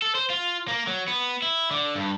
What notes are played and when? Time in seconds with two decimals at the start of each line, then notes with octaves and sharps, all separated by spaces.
0.02 A4
0.15 C5
0.30 F4
0.68 A#3
0.87 F#3
1.08 B3
1.42 E4
1.71 D3
1.95 G2